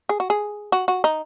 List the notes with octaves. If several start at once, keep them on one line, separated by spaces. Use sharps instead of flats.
G#4
F#4
G#4
F#4
F#4
D#4